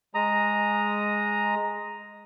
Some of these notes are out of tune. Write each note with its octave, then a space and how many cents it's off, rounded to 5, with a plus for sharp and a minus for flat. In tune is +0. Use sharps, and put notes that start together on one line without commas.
G#3 +0 A#5 +0 D#6 +0